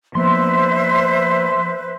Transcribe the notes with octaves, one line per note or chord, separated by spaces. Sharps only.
F3 A#3 B3 B4 C5 E5 C6